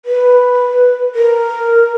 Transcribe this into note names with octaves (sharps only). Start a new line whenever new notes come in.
B4
A#4